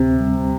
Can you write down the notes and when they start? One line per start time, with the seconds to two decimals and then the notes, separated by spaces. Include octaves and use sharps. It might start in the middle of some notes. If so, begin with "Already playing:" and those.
Already playing: D2 C3 C4
0.20 G3